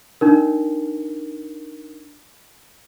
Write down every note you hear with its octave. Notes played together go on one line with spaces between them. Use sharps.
D4 D#4 A#4